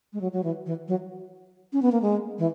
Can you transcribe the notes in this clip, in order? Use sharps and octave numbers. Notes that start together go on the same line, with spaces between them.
G#3
F#3
F#3
E3
E3
F#3
C#4
B3
A#3
G#3
E3